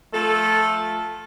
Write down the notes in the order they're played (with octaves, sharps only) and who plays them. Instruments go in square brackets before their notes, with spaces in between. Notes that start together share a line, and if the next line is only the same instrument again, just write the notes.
[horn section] F3 A3 A4